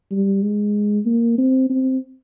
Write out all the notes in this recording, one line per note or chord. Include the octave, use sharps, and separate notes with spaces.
G3
G#3
A#3
C4
C4